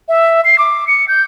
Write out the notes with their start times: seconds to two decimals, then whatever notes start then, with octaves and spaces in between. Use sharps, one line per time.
0.09 E5
0.45 C7
0.58 D6
0.87 C#7
1.08 G6